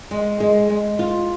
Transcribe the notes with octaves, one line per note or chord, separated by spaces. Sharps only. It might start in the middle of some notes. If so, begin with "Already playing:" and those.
G#3
G#3
G#3
F4